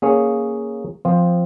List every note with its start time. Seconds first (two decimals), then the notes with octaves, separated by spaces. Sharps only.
0.02 A#3 C#4 G#4 C#5 F5
1.05 F3 C4 F4 C5